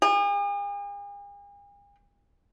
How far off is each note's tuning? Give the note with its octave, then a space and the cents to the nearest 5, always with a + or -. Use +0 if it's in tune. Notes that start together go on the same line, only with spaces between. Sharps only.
G#4 -45